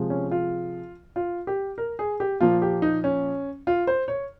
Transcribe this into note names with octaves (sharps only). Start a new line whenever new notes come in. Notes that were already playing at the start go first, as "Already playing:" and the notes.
Already playing: C3 F3 G#3
C#4
F4
F4
G4
A#4
G#4
G4
A#2 F3 A#3 F4
G4
D#4
C#4
F4
C5
C#5